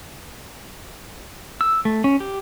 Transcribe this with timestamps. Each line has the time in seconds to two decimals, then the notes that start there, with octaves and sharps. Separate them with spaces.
1.61 E6
1.85 A3
2.04 C#4
2.20 G4